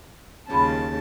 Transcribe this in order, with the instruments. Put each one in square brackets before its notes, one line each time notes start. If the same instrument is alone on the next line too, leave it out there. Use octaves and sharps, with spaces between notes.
[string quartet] D#2 C#3 A5 [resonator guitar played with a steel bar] A2 G3 F4